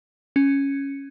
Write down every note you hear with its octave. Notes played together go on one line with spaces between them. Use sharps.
C#4